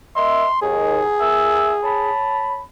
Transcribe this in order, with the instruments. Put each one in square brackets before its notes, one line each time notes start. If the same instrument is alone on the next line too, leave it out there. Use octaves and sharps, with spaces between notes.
[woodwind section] A#4 D#5 E5 [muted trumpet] C6
[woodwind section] D#2 [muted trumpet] G#4
[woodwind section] A#4 E5 E6
C#5 A5 B5